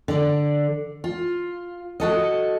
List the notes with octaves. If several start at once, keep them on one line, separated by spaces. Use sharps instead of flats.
D3 D5
F4
F#4 A4 D#5